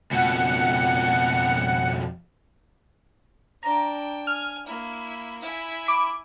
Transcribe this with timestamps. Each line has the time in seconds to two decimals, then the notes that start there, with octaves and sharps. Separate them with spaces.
0.12 F2 B2 F#5
3.63 D4 G5 A#5
4.27 G#5 F6
4.66 A#3 E4
5.41 E4 G#5
5.86 B5 D6